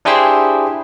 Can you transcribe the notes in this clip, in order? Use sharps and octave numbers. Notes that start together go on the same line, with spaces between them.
D4 E4 G4 G#4 C5